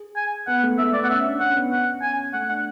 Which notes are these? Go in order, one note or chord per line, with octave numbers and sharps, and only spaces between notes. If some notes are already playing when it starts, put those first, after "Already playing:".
Already playing: G#4
G#5
B3 F#5
A3
A3 E5
B3 D5
F#5
C#4 E5
D4
C#4 F#5
B3
C#4 F#5
C#4 G#5
A3 F#5
D4 F#5